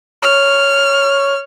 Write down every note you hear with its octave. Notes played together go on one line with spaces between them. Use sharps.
C#5 F6